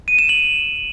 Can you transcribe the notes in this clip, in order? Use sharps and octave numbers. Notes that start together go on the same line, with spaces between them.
D#7
E7
F#7